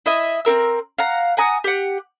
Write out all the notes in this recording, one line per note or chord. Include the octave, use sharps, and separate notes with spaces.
E4 D#5 E5
C4 F4 A#4 E6
F5 F#5 A#5
F#5 G#5 A#5 D#6
G4 F#5